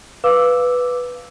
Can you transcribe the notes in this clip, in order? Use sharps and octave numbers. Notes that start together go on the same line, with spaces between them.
B4 F5 D6 E6